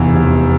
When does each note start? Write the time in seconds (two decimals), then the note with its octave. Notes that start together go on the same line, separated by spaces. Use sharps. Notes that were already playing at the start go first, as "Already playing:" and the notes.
Already playing: F1 E2 E3
0.16 F1